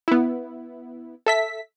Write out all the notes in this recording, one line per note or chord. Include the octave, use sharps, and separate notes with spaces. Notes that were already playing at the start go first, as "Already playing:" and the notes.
B3 E4
A4 E5 B6